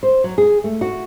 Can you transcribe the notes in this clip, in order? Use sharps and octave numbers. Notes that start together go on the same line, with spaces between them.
C5
F#3
G#4
A3
F#4